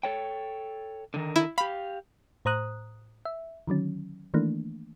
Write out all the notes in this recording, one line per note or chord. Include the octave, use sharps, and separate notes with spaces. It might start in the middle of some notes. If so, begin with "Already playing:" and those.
A4 C#5 G5
D3 D#3 A#4
E4
G4 F5 B5
A2 C5 A#5 D#6 F#6
E5
D3 D#3 F#3 C#4
D#3 E3 A3 A#3 D4